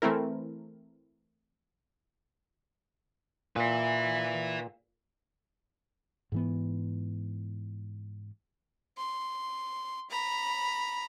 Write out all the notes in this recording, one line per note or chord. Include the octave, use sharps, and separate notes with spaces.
E3 A3 C4 E4 A#4
A#2 B4 E5
G#2 E3 B3
C6
A#5 B5